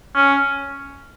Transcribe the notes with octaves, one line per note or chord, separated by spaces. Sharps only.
C#4